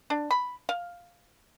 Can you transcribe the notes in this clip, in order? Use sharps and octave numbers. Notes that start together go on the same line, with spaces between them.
D4
B5
F5